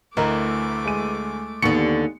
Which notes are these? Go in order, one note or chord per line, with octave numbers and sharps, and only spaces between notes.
D2 E3 A3 A#4 D#5 A#5 D6
G#3 D#7
D#2 D3 B3 C#6 C#7